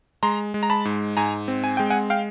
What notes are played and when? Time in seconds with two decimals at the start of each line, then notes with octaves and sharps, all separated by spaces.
0.23 G#3 A#5 C6
0.54 G#3
0.63 A#5
0.70 A5 B5
0.85 G#2
1.17 G#2 G#5 A#5
1.48 C4
1.64 G#5
1.77 G#3 G5
1.90 F#5 G#5
2.10 F5 G5